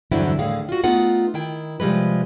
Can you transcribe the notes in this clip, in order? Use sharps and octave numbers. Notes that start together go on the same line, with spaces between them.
E2 G2 D3 F#3 C4 E4
D#2 A2 D3 G#4 F5
F4 F#4
A3 B3 D#4 F4 G#4 F#5
D#3 E4 G5
C3 F3 G3 G#3 B4